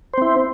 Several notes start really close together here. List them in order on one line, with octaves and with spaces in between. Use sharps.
C5 C4 E4